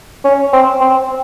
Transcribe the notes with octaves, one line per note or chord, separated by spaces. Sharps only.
C#4
C4
C4